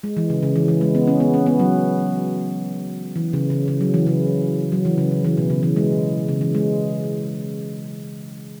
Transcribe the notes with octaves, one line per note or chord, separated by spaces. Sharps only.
G#3
E3
C#3
C#3
E3
E3
G#3
B3
C#4
B3
C#4
B3
F#3
E3
C#3
C#3
C#3
F#3
E3
C#3
F#3
E3
C#3
C#3
E3
B2
C#3
E3
G#3
C#3
E3
G#3